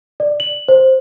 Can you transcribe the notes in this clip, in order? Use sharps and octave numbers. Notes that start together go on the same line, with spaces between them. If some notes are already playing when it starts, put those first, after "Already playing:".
D5
F#7
C5